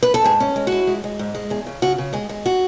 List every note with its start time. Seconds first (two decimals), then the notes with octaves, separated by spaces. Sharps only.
0.03 B4
0.14 A4
0.24 G#2 G#4
0.40 C#4
0.56 G#3
0.67 F#4
0.72 E4
0.87 G#3
1.04 G#3
1.19 G#2
1.35 G#3
1.50 E2 G#4
1.66 C#3
1.82 C#3 F#4
1.98 C#3
2.13 G#3 G#4
2.29 G#3
2.46 F#4